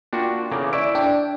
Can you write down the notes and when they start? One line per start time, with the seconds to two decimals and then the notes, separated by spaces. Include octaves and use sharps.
0.13 A#3 D4 F4 F#4 G5
0.51 E2 C#3 A#3 A4 D6
0.73 E4 D5 C#6 D7
0.95 D4 G5